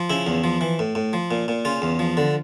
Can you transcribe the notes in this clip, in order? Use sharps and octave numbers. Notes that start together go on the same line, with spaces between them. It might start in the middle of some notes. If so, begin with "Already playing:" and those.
Already playing: F3
C#3 E4
E2
F3
E3
A2
A2
F3
A#2
A#2
C#3 F4
E2
F3
D3